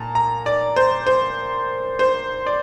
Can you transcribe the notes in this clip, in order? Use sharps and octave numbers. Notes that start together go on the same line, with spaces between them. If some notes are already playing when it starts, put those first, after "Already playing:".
Already playing: A#2 A5 A#5
A#5
D5
C5
C5
C5
D5